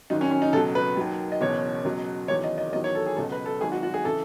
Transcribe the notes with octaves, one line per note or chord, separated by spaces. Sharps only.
G#1 F#2 D#3 F#3 D#4
C#4
C#4
D#4
C#2 B2 F#3 A4
B4
D#2 D#3 F#3
D#5
F#1 E2 B2 C#5
C#2 B2 F#3
F#1 E2 D#3 F#3 C#5
D#5
D#5
E2 D#3 F#3 D#5
C#5
A4
G#4
C#2 B2 F#3 A4
B4
A4
G#1 G#2 F#3 G#4
F#4
F#4
G#4
C#3 E3 A4